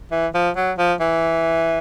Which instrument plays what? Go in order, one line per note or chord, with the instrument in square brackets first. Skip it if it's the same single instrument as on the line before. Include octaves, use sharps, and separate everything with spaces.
[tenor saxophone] E3
F3
F#3
F3
E3